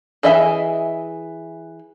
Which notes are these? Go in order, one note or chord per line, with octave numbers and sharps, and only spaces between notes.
E3 G#4 D#5 E5 G#5